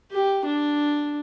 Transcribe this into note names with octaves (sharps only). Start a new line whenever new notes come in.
G4
D4